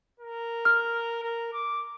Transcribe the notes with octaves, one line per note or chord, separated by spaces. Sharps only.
A#4
F6
A#4
D6